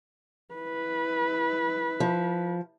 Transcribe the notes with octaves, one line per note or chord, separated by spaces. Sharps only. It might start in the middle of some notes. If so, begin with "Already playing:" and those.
E4 B4
F3